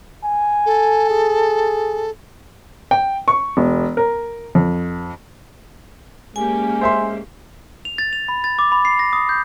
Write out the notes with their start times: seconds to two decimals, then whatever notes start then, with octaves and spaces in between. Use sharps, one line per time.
0.24 G#5
0.66 A4
1.10 G#4
2.91 G5
3.28 C#6
3.57 E1
3.97 A#4
4.55 F2
6.36 G#3 A#3 C#4 G4 G#5
6.81 C5 E5 C6
7.85 F7
7.98 A6
8.13 F7
8.28 B5
8.44 A6
8.59 D6
8.72 B5
8.85 C7
8.99 A#6
9.13 D#6
9.29 G6